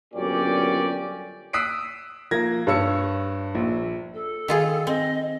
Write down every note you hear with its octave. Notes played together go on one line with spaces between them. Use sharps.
G1 F#2 A#2 C#4 G4 D5
D#6 E6 F#6 B6 C7 D7
F3 A#3 G#6 A#6
G2 C#5 E6 C#7
A#1
A4
D#3 F4 G#4
C4 D#5